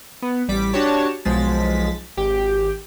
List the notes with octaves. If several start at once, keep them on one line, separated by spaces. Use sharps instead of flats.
B3
A1 G3 D6 B6
D4 F#4 G4 C#5 A5
B1 F3 G#3 A6 B6
G#1 G4